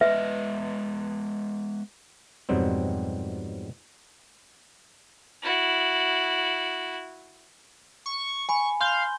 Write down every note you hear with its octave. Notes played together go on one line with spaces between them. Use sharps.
G#3 B3 B4 D#5 E5
F2 G#2 B2 F#3 G3 C4
E4 F#4
C#6
G#5 B5 C#6
F5 C6 G6 G7